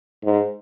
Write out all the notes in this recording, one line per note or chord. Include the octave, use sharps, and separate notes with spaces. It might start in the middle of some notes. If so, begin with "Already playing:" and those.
G#2